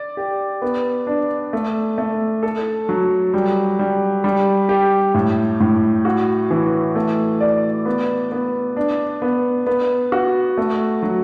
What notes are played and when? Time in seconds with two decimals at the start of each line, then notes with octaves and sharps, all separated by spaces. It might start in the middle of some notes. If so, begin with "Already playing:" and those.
Already playing: D5
0.17 G4
0.62 B3
1.07 D4
1.53 A3
1.98 A3
2.43 A4
2.89 F#3
3.34 G3
3.79 G3
4.24 G3
4.69 G4
5.14 A2
5.60 A2
6.05 F#4
6.51 E3
6.95 A3
7.41 D5
7.86 B3
8.32 B3
8.77 D4
9.22 B3
9.67 B3
10.12 F#4
10.58 A3
11.03 F#3